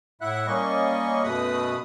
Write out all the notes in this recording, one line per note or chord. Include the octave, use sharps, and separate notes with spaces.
A2 E4 E5 F#5 F#6
G3 A#3 C#4 D#5 C#6
F#2 B2 A3 B4 B5 D#6